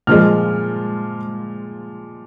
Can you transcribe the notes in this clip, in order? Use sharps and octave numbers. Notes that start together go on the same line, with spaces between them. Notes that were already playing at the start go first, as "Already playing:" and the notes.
A#2 F3 G#3 F6